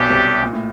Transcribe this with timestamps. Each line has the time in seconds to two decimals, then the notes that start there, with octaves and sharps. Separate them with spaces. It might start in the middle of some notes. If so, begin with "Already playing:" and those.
Already playing: B1 B2 A3 D4 G4
0.10 C2 C3
0.42 A#2
0.53 A2